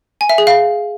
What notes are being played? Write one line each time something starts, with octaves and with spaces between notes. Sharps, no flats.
G#5
E5
G#4
F5